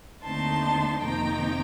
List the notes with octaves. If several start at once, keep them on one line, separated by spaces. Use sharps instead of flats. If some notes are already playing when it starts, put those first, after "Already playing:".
D#2 D3 A3 C4 D#4 A5 C6
F2 C3 D#3 A#3 D#4 G5 A#5